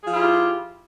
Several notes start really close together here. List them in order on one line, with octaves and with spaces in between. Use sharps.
G#4 F3 F4 E4 G4